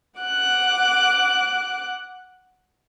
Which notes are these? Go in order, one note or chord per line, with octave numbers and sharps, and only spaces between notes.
F#5 D6 F#6